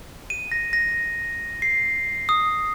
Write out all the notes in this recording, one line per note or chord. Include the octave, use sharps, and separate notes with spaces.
D#7
A#6
A#6
C7
D#6